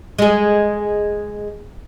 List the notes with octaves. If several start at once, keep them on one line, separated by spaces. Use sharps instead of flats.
G#3 G#4